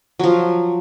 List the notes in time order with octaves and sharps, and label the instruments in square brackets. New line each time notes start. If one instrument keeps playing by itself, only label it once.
[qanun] F3 F#3